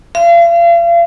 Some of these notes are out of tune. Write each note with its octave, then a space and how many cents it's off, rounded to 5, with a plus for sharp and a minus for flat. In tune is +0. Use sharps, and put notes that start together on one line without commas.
F5 -40